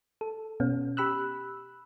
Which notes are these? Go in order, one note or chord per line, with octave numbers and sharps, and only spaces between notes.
A4
B2 B3 C#4
G4 B5 E6 F#6